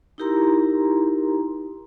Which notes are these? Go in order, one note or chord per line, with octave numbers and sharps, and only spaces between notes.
D#4 E4 G4 A#4 A#5 C6